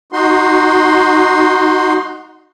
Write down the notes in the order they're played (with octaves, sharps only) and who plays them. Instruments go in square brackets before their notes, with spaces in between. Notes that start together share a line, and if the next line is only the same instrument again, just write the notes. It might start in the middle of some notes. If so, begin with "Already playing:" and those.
[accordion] D#4 F#4 C6